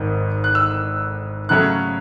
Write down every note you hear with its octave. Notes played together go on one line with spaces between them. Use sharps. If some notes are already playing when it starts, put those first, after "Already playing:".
Already playing: G#1 G#2 D#3
F#6
E6
C#3 F#3 A3 C#4 F#6